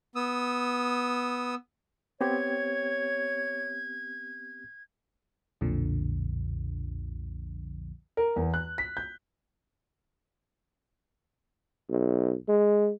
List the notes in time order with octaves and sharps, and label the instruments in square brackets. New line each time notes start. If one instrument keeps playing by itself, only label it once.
[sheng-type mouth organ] B3 D#6 E6
[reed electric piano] B3 C4 G4 [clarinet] C#5 [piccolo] G#6
[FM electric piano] B1 F2 A#2 D3 F3
[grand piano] A#4
E2
F#6
B6
G6
[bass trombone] B1
G#3